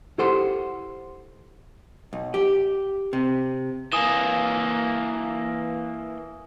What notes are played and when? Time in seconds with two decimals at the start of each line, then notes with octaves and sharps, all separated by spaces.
0.18 E4 G4 A4 C5 F#5 C6
2.13 B1
2.34 G4
3.13 C3
3.92 E3 A#3 G#5 D#6 E7